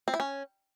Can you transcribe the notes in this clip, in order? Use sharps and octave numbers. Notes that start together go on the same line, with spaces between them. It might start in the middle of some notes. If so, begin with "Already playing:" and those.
C4
E4
C#4